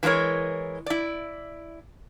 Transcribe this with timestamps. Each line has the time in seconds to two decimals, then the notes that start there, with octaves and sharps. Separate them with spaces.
0.03 E3 G#3 F4 A#4 C#5
0.86 E4 D5